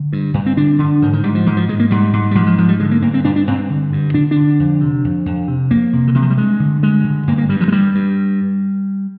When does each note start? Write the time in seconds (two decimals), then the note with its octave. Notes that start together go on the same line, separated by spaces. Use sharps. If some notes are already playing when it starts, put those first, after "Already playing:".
Already playing: D3
0.13 G2
0.34 G2
0.46 C4
0.57 D3 D4
0.79 D3
1.02 G#2 D#3
1.13 D#3
1.24 G#2 G3
1.35 F3
1.46 G#2 D#3
1.57 F3
1.69 G#2 G#3
1.80 A#3
1.91 G#2 G3
2.13 G#2
2.31 G3
2.35 G#2 F3
2.47 F3
2.58 G#2 F3
2.69 G3
2.80 D3 G#3
2.91 A#3
3.02 G2 A#3
3.14 C4
3.24 G2 D4
3.36 D4
3.47 G2 C4
3.70 D3
3.92 G2
4.14 D3 D4
4.31 D3 D4
4.59 F2
4.81 C3
5.04 F2
5.26 F2
5.48 C3
5.71 F2 A#3
5.93 C3
6.08 D3
6.15 C3 D#3
6.22 F3
6.30 G3
6.38 G2 G#3
6.60 D3
6.83 G2 G#3
7.04 D3
7.27 G2 A#3
7.38 A#3
7.49 G2 G3
7.61 F3
7.68 G#3
7.72 G2 G3
7.95 G2